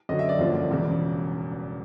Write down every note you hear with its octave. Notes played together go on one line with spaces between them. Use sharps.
F#2 D3 F#3 D#5
E5
D5
G1 F#2 D3 F3 A#3
E1 E2 C#3